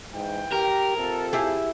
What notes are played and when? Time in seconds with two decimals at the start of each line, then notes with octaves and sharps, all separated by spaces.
0.14 G#2 E3 G5
0.52 G4 A#4
0.97 C3 F4 A4
1.33 E4 G4 G#4